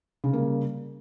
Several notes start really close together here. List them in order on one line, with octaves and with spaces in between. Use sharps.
C#3 C#4 A#3 G3